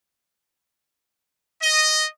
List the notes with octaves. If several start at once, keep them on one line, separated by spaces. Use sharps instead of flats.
D#5